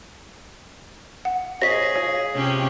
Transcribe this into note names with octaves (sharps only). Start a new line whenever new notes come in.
F#5
G#4 C5 C#5 D#5 A#6 B6
F4 C#5
C3 C#4 G4